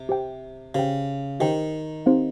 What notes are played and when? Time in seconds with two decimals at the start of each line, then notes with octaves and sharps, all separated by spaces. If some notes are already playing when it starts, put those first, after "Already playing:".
Already playing: C3
0.09 G4 C5 G5
0.75 C#3 G4 C5 G5
1.40 D#3 G4 C5 G5
2.06 C4 D#4 G4 C5 F5